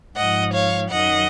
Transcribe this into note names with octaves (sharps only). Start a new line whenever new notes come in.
G#2 F3 D#5 F#5
C#5 F5
F#2 D#3 F#3 D#5 F#5